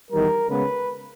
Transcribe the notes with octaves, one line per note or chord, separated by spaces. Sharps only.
E2 D#3 G3 A#4
C#3 G#3 B3 B4